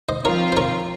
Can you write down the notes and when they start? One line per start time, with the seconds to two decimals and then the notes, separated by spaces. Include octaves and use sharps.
0.09 C5 D#5
0.25 F3 C4 F4 A#4 C#5
0.52 C5
0.57 A#4 C#5